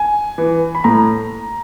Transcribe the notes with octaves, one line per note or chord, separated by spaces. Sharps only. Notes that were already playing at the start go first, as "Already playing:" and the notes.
Already playing: G#5
E3
B5
A2 A#5